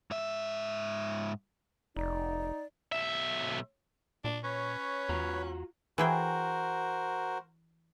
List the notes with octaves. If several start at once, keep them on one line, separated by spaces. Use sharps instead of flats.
G#2 E5
F1 D#4 D5
B1 E5
A#2 D4
C#4 B4 C#5
E2 F4 F#4 A#5
E3 F#4 G#4 A#4 C5 G5